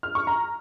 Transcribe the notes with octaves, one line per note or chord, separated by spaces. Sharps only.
F6
C#6
A#5